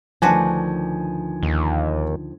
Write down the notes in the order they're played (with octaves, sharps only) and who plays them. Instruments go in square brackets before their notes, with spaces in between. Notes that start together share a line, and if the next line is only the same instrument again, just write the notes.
[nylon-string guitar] D2 D#3 F3 [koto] D4 F#4 B4 [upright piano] G#5
[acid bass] D#2